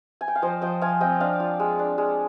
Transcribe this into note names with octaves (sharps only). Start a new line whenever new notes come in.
G#5
G5
F5
F3 C5 D#5
F3 D#5 G5
F3 F5 G#5
C4 D#5 G5
D4 D5 F5
F4
G#3
D4
G#3